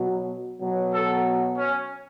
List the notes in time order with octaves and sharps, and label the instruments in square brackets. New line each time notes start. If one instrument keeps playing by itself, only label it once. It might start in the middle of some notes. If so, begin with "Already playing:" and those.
Already playing: [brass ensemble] B2 F#3
B2 F#3
A4
C#4